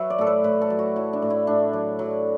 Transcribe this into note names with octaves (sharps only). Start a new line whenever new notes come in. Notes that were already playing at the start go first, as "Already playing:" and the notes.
Already playing: F#3 B4 E5
D5
A2 A4
B4
A2 B4
A4
F#3
F#4
F#3 E4
D4
A2
E4
A2 D4
F#3
F#3